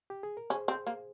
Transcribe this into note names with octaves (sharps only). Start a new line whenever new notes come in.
G4
G#4
A#4
C#4 G#4 C5
C4
A#3